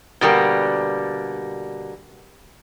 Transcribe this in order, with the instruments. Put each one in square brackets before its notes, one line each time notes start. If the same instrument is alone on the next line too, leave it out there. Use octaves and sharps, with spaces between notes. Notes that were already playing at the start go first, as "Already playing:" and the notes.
[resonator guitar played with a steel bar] B2 D3 G3 A#3